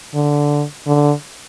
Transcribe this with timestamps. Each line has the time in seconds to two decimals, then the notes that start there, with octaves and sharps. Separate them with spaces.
0.14 D3
0.87 D3